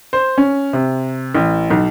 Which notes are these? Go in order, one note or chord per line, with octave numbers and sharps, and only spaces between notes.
C5
C#4
C3
A1
B1